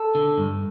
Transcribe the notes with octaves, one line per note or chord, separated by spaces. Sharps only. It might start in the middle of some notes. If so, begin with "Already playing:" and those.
Already playing: A4
D3
G2